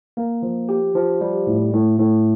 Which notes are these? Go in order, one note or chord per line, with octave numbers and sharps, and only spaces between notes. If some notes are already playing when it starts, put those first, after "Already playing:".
A#3
F3
G4
F3
G3
A2
A2
A2